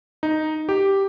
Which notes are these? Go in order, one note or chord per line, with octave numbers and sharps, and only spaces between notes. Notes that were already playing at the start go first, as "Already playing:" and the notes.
D#4
G4